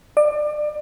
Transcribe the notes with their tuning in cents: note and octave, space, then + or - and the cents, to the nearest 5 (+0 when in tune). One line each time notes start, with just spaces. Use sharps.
D5 +30